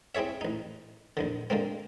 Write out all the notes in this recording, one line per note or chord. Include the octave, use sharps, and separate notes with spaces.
C4 E4 G#4 C#5 E5
A1 D#4
A#1 D#2 D3
D3 G#3 A#3 C4